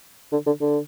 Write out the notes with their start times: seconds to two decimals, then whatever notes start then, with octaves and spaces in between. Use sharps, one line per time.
0.32 D3
0.46 D3
0.61 D3